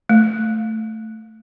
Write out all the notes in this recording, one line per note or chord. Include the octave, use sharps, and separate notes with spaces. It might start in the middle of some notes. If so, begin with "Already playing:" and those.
A3